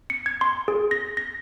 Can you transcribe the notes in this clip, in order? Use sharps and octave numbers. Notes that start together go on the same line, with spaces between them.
C#7
G#6
C6
G#4
A#6
A#6